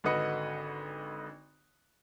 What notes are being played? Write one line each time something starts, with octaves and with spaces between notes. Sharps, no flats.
G#1 D3 F#4 B4 D#5 C#7